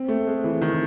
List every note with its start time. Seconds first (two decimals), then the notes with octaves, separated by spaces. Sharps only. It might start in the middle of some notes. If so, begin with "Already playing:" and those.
Already playing: C4
0.08 A3
0.27 G#3
0.44 E3
0.62 D#3